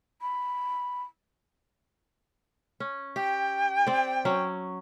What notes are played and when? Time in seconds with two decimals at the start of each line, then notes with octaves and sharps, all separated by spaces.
0.22 B5
2.80 C#4
3.16 G4 G5
3.87 C4 D5
4.25 F#3 C#4